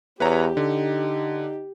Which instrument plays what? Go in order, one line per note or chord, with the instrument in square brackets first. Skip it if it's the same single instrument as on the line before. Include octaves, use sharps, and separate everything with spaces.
[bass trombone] E2 [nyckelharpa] G4 [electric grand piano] B4 C#5 A#5
[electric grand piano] D3 [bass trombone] D#4